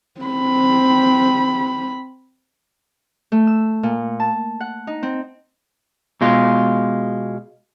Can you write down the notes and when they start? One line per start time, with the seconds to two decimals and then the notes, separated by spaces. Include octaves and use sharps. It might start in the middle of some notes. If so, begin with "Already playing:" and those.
0.21 C4 B5
3.32 A3
3.47 E6
3.83 A#2
4.20 A5
4.60 F#5
4.87 D#4
5.03 C4
6.21 B2 G#3 F4